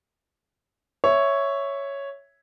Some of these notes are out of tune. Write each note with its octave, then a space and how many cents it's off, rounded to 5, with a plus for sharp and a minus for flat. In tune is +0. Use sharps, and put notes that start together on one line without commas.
C#5 +0 E5 +0